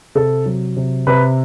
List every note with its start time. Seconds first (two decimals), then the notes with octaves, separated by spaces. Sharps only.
0.15 C3 A4
0.46 F#3
0.77 C3
1.07 C3 B4